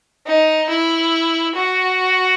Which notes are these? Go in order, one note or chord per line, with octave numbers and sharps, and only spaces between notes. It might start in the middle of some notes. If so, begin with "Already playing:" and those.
D#4
E4
F#4